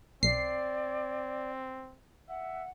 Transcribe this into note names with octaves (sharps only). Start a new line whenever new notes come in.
B1 C4 D5 C7
E5 F#5